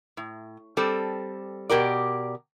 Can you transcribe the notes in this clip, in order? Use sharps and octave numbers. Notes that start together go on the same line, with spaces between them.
A2
G3 C4 A4
B2 G4 A#4 D5